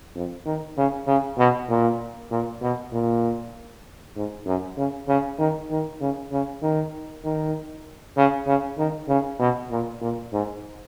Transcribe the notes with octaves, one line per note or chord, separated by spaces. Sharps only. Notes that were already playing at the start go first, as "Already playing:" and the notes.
F2
D#3
C#3
C#3
B2
A#2
A#2
B2
A#2
G#2
F#2
C#3
C#3
D#3
D#3
C#3
C#3
D#3
D#3
C#3
C#3
D#3
C#3
B2
A#2
A#2
G#2